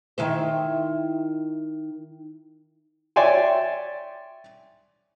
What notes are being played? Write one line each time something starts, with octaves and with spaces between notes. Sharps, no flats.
D#3 E4 C5
C#5 D5 E5 G5 G#5 C6